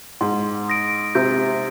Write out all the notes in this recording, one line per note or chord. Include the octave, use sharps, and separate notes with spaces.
G#2 C6
D#6 A#6 D7
C3 G6